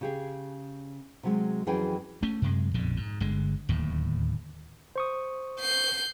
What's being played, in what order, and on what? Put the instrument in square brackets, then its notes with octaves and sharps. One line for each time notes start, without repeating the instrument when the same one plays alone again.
[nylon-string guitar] C#3 G4 G#4
C3 F#3 G#3
F2 E3 F#3 C#4 G#4 G5
[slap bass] A3 C#4
F#2 C3 G#3
A#1 F2 B2 D3
G#2
G1 D3 G#3
D1 D#2 A2
[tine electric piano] C5 C#6 D#6
[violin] G6 C7